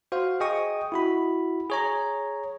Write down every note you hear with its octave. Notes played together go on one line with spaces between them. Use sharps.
F#4 C5 F5
G#4 D#5 G5 C#6 D#6
E4 F#4 B5
G#4 C#5 A#5